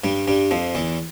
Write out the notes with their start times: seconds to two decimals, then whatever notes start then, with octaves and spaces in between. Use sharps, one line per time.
0.04 G2 G3
0.28 G2 G3
0.51 F2 F3
0.75 E2 E3